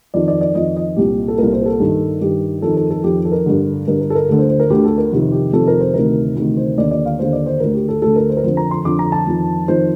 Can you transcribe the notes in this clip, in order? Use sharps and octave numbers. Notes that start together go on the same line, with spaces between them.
F2 D#3 D5
D5
D5
F2 D#3 D#5
D#5
C2 A#2 G4
A4
C2 A#2 A#4
C5
A#4
A4
G2 D#3
G2 D#3 G4
F2 D#3 A4
A4
A4
F2 D#3 G4
A4
A#4
G2 D3
G2 D3 A#4
A#4
A4
A#4
D2 D3 A4
C5
C5
A#4
D2 D3 G4
A4
A#4
F2 C3 D#3
G4
F2 C3 D#3 A4
A#4
C5
D2 C3 D#3 A#4
D2 C3 D#3
C5
D#2 D3 D5
D5
F5
D#2 D3 C5
D5
C5
D2 D3 A#4
G4
A4
D2 D3 A4
A#4
C5
A#4
F2 D3 C5
A#5
C6
F2 D3 D6
A#5
A5
F2 D#3
F2 D#3 C5